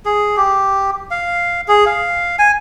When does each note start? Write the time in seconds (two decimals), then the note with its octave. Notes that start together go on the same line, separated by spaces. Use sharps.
0.05 G#4
0.37 G4
1.11 F5
1.68 G#4
1.86 F5
2.39 G#5